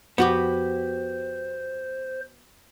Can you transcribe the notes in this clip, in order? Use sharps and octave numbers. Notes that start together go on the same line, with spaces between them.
F2 B3 F#4 G4 C5